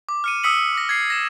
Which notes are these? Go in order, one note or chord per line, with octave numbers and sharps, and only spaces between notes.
D6
F6 C#7 D#7
D#6 E6 B6 C#7 F#7
D6 A#6
G#6 C7
A#6 E7